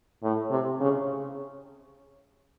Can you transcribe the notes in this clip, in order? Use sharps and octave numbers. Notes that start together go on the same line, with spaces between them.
A2
C3
C#3